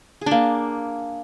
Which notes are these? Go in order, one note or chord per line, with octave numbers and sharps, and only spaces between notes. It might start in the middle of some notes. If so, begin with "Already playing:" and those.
A#3 D4 G#4